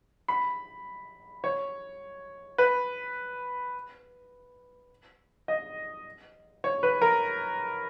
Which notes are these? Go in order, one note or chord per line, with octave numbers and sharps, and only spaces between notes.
B5
C#5
B4
D#5
C#5
B4
A#4